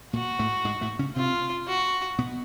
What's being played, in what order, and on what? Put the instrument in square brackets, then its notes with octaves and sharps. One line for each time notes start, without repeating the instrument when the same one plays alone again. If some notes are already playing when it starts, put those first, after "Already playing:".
[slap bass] A#2 A#3 [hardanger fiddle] F#4
[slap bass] A2 A3
G#2 G#3
A2 A3
C#3 C#4
[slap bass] C3 C4 [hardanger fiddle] F4
[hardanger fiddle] F#4
[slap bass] B2 B3